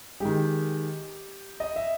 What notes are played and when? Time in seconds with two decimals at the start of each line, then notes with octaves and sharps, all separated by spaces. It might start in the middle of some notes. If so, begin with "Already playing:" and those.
0.20 D#3 G#3 G4
1.60 D#5
1.76 E5